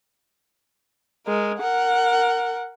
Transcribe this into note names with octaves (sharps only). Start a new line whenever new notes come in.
G#3 A#4
A#4 F#5